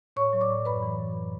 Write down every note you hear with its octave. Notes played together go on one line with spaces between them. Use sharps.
A2 C#5 C#6
F#3
D5 D6
A2
F#2 B4 B5
E3
F#2